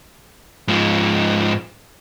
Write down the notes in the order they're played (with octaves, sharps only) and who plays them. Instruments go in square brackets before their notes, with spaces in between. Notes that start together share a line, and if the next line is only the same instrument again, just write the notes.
[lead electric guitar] G#2 F3